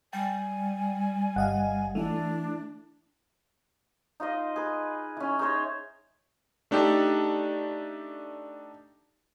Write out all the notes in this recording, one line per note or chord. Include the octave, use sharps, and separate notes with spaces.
G3 G5 G#5
G1 D#5 F5 F#5
E3 A3 D4 E4
D#4 F4 C5 D#5
G#4 B4
E3 C#4
D#4 G#4 C5 C#5
A3 D4 D#4 G4 A4